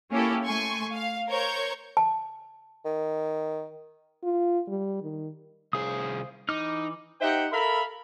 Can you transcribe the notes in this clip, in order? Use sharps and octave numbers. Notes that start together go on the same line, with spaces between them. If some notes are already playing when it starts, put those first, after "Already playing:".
A#3 C#4 E4 G4 A4
A3 G#5 C6 C#6
F5
A#4 C5 C#5 C#6 G6 G#6
A5
D#3
F4
G3
D#3
C2 G#4 C5 F5 D#6
E3 D#4 D6 F6
D#4 G4 C5 E5 F#5 G5
A4 A#4 E5 F5 B5